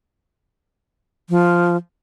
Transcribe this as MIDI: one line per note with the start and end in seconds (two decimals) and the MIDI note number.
1.30 1.76 53